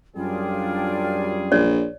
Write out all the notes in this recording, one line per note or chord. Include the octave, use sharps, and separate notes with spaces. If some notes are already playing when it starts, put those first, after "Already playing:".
F#2 G3 D4 F4 G#4 G5
A#1 C#5 D5